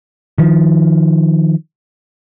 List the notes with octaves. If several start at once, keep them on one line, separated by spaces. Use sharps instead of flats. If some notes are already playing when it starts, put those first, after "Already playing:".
D#3 F3